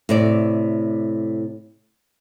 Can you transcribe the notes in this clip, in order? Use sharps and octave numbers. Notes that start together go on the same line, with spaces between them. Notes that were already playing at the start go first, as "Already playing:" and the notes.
A2 C3 D5